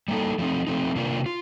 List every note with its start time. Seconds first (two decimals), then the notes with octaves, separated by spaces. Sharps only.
0.08 G3 A#3 D#4 A4
0.38 F3 A3 C4 D#4
0.67 F3 A3 C4 D#4
0.96 C3 D#3 A#3 D4 F4
1.26 F4